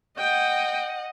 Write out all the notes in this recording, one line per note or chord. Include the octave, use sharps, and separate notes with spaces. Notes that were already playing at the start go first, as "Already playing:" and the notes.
D#5 F#5 G5